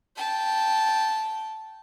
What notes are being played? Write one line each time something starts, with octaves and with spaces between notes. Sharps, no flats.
G5 A5